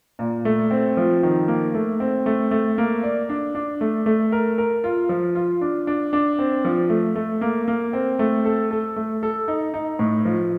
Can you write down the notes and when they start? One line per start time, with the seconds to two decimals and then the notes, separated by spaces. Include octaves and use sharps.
0.19 A#2
0.45 A3
0.71 C4
0.97 F3
1.23 D#3
1.48 A#3
1.74 A3
2.00 C4
2.26 A3
2.51 A3
2.78 A#3
3.03 D5
3.29 D4
3.55 D4
3.81 A3
4.06 A3
4.32 A#4
4.58 A#4
4.84 F4
5.09 F3
5.35 F4
5.61 D4
5.87 D4
6.13 D4
6.39 C4
6.65 F3
6.90 A3
7.15 A3
7.41 A#3
7.68 A#3
7.93 C4
8.19 A3
8.45 A4
8.71 A4
8.96 A3
9.23 A4
9.48 D#4
9.74 D#4
9.99 A2
10.25 F3